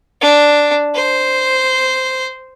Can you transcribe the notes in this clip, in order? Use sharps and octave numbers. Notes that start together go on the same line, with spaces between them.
D4
C5